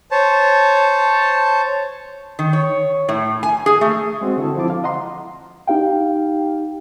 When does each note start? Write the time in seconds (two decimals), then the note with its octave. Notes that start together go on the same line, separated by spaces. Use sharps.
0.11 C5 C#5 A5
2.39 D#3
2.53 C#5
3.09 A2
3.43 G#5
3.66 G#4
3.81 A3
4.21 G#3 C4 F#4
4.38 D3 E4 A4
4.57 F3 C4 E4 A5 D6
4.70 F5
4.84 D#5 F#5 A#5 C6
5.67 D#4 G4 F5 G5